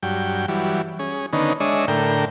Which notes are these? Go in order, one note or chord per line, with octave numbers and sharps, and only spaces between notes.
G2 F#3 G5
E3 F#3 G3
C#4 G#4
D3 D#3 B3 C#4 D#4
G#3 D4 C#5 D#5 E5
A2 D3 A#4 G5